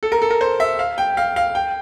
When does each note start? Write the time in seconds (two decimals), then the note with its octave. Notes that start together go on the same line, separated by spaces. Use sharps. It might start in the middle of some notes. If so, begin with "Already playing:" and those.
0.03 A4
0.12 A#4
0.22 A4
0.30 A#4
0.41 C5
0.60 E5
0.79 F5
0.98 G5
1.17 F5
1.36 F5
1.55 G5